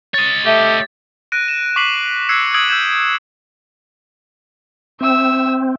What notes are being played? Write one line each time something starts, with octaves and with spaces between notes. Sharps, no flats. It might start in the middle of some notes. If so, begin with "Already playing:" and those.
C#5 D#5 A6
A3 G4 E5
F#6 A#6 D7 D#7
E7
C#6 D6 B6 C7 D#7 F#7
E6 F#6 G#6 C7 C#7
D#6 E6 G#6 D7 D#7 F#7
E6 G6 G#6 E7
C4 E5 E6